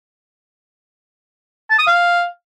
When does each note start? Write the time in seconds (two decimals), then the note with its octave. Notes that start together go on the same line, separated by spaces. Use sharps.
1.71 A5
1.79 D#6
1.87 F5